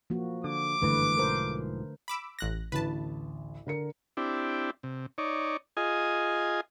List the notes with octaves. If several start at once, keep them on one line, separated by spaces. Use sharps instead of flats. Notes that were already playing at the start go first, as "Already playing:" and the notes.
F3 A#3 F#4
D3 D6
F#1 G2 D3 E3 A3 B4
B1 G#2 F3 A#4 C5
B5 D6 E6
A1 F#6 A#6
A1 D2 B4 A5
D3 A#4 C#7
C4 D4 E4 G4
C3
D#4 C#5 D5
F4 G#4 D#5 G#5